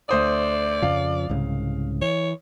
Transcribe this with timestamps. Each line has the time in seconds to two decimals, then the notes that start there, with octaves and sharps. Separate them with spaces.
0.09 D2 C5 D5 D#6
0.82 F2 C#3 F3 F5
1.29 C2 G#2 C#3
2.02 E3 C#5